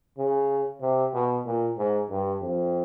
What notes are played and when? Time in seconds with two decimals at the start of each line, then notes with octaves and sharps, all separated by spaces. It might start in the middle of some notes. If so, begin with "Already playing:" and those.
0.18 C#3
0.81 C3
1.14 B2
1.46 A#2
1.78 G#2
2.10 G2
2.42 F2